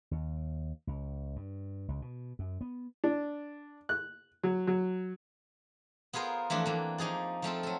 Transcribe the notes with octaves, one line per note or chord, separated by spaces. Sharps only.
D#2
C#2
G2
C#2
B2
F#2
B3
D4
F#6
F#3
F#3
B3 F4 G#4 A#4 C5
E3 F3 A3 C4 D4
E3 A#3
F3 D#4 G#4 D5
F3 A3 C4 F4
F#3 A4